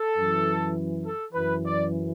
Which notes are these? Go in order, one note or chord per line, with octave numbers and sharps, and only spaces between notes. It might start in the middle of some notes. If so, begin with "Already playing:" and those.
Already playing: A4
F#2 E3
A4
F#2 E3 B4
D5